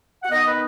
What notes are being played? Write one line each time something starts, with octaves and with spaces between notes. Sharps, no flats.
F#5
D#3 B3 D#4 D#5
B4